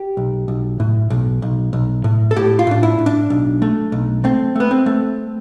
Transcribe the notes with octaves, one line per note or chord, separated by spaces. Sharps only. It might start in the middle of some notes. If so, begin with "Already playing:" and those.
Already playing: G4
B1
B1
A2
B1
B1
B1
A2
A4
A2 G4
F4
A2 D4
E4
A2
D4
B1
A3
B1
A3 C4
A3 B3
C4
A3